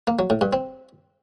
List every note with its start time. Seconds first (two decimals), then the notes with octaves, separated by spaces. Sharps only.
0.07 A#3
0.19 F#3
0.30 A2
0.41 G2
0.53 C4